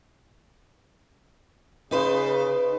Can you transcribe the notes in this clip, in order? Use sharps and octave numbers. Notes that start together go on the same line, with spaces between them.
C#3 D#4 B4 C5